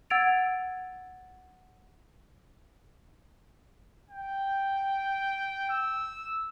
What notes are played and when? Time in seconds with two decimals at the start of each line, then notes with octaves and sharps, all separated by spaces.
0.10 F#5 E6 G#6 A6 D7 F7
4.10 G5
5.70 E6